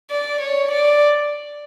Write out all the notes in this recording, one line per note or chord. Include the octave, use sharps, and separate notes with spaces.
D5
C#5
D5